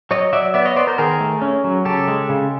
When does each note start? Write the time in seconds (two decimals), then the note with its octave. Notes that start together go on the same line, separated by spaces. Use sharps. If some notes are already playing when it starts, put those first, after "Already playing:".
0.11 F#3 C#5 D#5
0.33 F#3 D5 E5
0.54 B3 D5 E5
0.65 C#5 D#5
0.76 B3 C5 D5
0.87 A#4 C5
0.98 D#3 G#4 A#4
1.20 A3
1.42 C#4
1.64 F#3
1.85 C#3 G4 A4
2.08 G#3
2.29 C#3